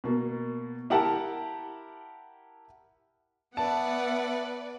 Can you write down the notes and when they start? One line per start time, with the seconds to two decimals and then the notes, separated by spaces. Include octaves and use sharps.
0.04 B2 A#3
0.90 E4 G4 A#4 F#5 A5
3.57 B3 B4 D5 E5 F#5 A5